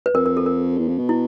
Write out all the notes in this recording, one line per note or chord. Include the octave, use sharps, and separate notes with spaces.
B4
F2 A#4
A#4
A4
A#4
E2
F2
B2
E4